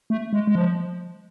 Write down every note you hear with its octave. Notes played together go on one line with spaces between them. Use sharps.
A3
G#3
G#3
F3